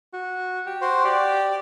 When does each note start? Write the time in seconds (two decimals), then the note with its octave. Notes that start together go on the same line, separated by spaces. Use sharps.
0.13 F#4
0.66 G4
0.82 F#4 C5
1.04 G4 D5